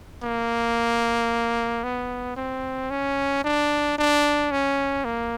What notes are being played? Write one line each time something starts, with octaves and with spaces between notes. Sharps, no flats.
A#3
B3
C4
C#4
D4
D4
C#4
A#3